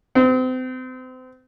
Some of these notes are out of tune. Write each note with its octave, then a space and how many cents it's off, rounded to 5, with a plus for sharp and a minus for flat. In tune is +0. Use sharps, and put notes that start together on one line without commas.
C4 -35